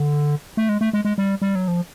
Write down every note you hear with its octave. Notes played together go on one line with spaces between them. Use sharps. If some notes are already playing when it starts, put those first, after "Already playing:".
Already playing: D3
A3
G#3
A3
G#3
G#3
G3
G3
F#3
F3